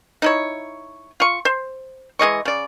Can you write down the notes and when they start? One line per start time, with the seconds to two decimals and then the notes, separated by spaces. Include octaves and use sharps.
0.22 D#4 E4 C#5
1.20 F4 C#6
1.45 C5
2.19 E3 G#3 D#5 C#6
2.45 C#3 D5